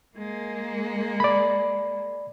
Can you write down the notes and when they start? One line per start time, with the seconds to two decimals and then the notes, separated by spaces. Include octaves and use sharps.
0.17 G#3 A#3
1.20 D5 B5